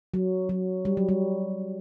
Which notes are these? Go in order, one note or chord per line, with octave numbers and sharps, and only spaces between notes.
F#3
F#3
G3
F#3
G3